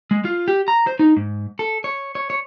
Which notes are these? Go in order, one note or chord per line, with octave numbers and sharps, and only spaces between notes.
G#3
F4
G4
A#5
C5
D#4
G#2
A4
C#5
C#5
C#5